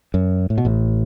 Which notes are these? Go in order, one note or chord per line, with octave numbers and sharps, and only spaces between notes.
F#2
A2
B2
A1 A2